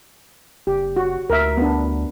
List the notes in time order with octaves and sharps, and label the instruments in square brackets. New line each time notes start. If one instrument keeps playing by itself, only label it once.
[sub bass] F#1 [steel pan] G4
[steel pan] F#4
[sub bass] D2 [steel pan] A#4 E5
[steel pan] B3 D4